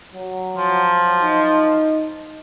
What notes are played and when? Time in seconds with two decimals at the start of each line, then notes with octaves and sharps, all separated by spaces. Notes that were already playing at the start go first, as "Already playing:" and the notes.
0.14 F#3
0.57 F3
1.21 D#4